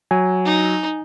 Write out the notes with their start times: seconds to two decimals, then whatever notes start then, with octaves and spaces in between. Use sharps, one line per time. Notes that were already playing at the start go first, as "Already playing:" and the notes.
0.11 F#3 G#5
0.45 D#4